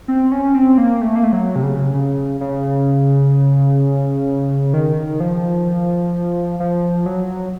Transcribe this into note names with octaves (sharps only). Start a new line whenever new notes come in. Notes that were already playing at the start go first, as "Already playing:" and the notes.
C4
C#4
C4
A#3
A3
A#3
A3
F#3
C3
C#3
C#3
C#3
D#3
F3
F3
F#3